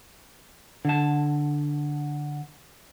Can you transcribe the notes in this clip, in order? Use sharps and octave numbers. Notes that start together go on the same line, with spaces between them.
D3 A5